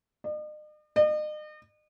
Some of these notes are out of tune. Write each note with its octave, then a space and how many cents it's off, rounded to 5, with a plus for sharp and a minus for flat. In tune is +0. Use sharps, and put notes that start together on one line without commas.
D#5 -45
D#5 -40